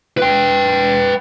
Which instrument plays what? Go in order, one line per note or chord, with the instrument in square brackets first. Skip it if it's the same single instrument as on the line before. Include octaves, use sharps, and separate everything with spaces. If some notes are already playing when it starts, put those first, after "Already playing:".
[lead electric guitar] B4 G5